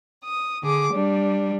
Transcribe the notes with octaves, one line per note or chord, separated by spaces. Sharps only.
D#6
D3 G#4 D6
G3 D4